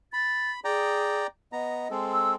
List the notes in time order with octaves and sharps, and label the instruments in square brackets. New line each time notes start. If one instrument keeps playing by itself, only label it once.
[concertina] B5 [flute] A6
[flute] G#4 [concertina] D5 G5 A#5
[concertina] B3 A#5 [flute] D#5
[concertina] G#3 C4 A4
[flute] E6